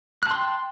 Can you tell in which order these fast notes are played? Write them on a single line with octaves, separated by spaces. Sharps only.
F#6 A5 C6 G5